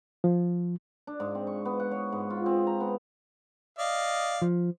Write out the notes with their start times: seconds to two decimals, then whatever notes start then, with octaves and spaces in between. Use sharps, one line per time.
0.24 F3
1.07 D4
1.20 G#2
1.35 C4
1.47 C#6
1.65 B3
1.80 F#5
1.91 C#5
2.12 G#2
2.30 F4
2.46 C4
2.67 A#5
2.80 B3
3.79 D5 D#5 F5
4.42 F3